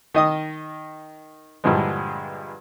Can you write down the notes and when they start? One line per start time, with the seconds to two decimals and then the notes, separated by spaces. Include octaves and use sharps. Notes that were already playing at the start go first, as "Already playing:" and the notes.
0.14 D#3 D#5 D#6
1.64 G2 A#2 D3 E3 F3 G#3